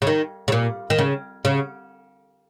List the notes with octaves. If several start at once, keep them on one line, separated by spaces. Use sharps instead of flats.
C#3
D#3
C#3
A#2
D#3
C#3
C#3